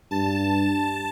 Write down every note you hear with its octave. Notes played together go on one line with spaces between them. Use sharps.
G2 A5